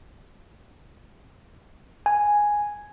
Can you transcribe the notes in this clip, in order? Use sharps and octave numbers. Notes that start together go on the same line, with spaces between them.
G#5